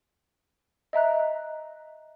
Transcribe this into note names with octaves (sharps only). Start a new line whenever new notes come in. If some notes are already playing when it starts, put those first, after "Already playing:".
D#5 E5 A#5 F#6